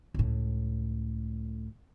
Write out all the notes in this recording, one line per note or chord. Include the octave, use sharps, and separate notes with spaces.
C#2 A2